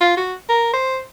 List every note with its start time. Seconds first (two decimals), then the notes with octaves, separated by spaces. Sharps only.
0.01 F4
0.17 F#4
0.49 A#4
0.73 C5